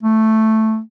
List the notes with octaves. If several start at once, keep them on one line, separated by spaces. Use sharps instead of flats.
A3